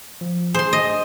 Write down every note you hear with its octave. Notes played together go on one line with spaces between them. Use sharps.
F3
G#4 C5 C6
D#5